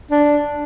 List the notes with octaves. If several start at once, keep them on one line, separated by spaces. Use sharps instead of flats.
D4